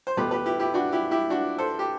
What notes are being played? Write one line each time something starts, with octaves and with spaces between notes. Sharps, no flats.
C5
E2 B2 A3 G4 B4
G4 B4
E4 G4
E4 G4
D4 F#4
E4 G4
E4 G4
D4 F#4
A4 C5
G4